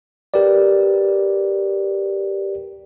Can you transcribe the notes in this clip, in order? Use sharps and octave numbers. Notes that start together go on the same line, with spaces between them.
G4 A#4 B4 D5